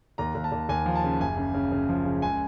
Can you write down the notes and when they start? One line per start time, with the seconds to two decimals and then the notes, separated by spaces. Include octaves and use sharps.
0.18 D#2 A#5
0.35 D#2
0.44 A5
0.52 D#2
0.69 D#2 G#5
0.86 F3
0.95 A5
1.04 C#3
1.20 F#1 G#5
1.37 C#3
1.54 C#3
1.72 C#3
1.89 F3
2.05 C#3
2.22 C#2 G#5